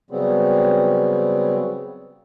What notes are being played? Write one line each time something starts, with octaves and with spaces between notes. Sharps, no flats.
C#3 F#3 G3 B3 C4